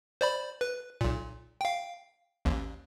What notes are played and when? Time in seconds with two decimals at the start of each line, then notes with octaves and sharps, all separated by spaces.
0.21 C5 D5 B5
0.61 B4
1.01 B1 A#2
1.61 F5 G5
2.45 A1 D#2